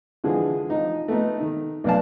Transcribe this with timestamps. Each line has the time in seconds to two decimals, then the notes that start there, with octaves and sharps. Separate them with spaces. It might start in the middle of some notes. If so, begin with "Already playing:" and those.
0.24 D3 E3 F3 G#3 G#4
0.70 F3 D#4
1.08 A3 B3 D#4
1.40 D#3
1.84 B1 A#3 B3 D5 F5 A5